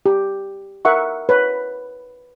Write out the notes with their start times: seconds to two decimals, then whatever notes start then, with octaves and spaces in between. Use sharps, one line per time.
0.06 G4
0.85 A#4 E5 F#5 C#6
1.29 B4 C#5